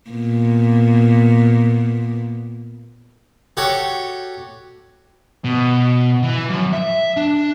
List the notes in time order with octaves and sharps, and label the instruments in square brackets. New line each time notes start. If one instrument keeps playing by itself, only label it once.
[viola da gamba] A#2 B3
[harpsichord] F#4 G4 A4 C#5
[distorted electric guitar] B2
E3
F#2
E5
D4